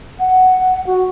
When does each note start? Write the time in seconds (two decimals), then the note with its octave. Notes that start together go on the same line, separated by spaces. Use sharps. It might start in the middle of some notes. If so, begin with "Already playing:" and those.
0.20 F#5
0.87 F#4